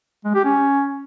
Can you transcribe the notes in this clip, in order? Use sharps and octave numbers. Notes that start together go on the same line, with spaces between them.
G#3
G4
C#4